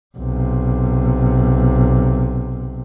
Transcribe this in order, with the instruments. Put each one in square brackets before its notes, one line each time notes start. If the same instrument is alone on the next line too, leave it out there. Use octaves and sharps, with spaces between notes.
[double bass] B1 C3